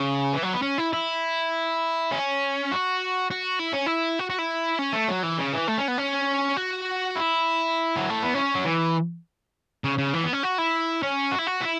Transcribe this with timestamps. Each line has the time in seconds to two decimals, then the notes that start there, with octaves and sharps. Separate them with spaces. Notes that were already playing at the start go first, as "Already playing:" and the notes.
Already playing: C#3
0.33 E3
0.43 F#3
0.53 B3
0.62 C#4
0.78 E4
0.93 E4
2.11 C#4
2.71 F#4
3.31 F#4
3.59 E4
3.73 C#4
3.86 E4
4.19 F#4
4.30 F#4
4.39 E4
4.79 C#4
4.93 A3
5.08 F#3
5.23 E3
5.39 C#3
5.53 E3
5.68 A3
5.78 C#4
5.88 B3
5.98 C#4
6.57 F#4
7.16 E4
7.96 F#3
8.10 A3
8.23 B3
8.34 C#4
8.55 F#3
8.65 E3
9.84 C#3
9.98 C#3
10.14 E3
10.24 B3
10.33 C#4
10.43 F#4
10.58 E4
11.02 C#4
11.31 F#4
11.38 E4
11.47 F#4
11.61 E4